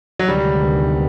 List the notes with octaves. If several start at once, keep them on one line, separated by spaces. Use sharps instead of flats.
F#3
D2 C3 D#3 G3 G#3 B3